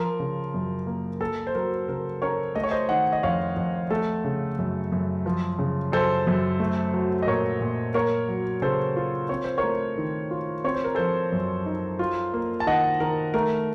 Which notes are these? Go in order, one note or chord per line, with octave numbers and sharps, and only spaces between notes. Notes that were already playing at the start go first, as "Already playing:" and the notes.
Already playing: F3 A#4
C#3
F#2
A#3
A#3 A4
C5
F#3 A#4
C#3 A#4
C#4 A#4 C#5
A3 D#5
C#5
C5 D#5
D#3 D#5 F#5
D#5
F2 C#5 F5
F2
A3 A4
C#3
F#2
F#2
F3
C#3
F#2 A4 C5
F#2
A3
F#3
D#5
A#2 A#4 C#5
A#2
A#3 A#4 C#5
F#3
C#3 A4 C5
F4
C4 C#5
C5
A#4 C#5
A3
D#3
F4
C4 C#5
C5
A#4
F3 A4 C5
F#2
D#4
F4
A#3
A5
D#3 D#5 F#5
D#3 A#4
A3 A#4